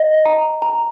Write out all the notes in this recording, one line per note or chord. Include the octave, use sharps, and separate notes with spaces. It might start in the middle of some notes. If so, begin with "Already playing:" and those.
Already playing: D#5
A#5
A#5